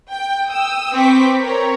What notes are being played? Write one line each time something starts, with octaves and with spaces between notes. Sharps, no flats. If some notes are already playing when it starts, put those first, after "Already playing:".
G5
G5 D#6 E6
C4 B4 C#6 D6 B6
C4 A#4 C#5 A#5